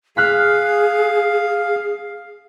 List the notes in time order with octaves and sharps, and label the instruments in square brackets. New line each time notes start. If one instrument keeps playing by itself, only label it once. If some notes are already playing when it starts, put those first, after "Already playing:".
[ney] G#4 [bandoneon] F5 [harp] F6 F#6 B6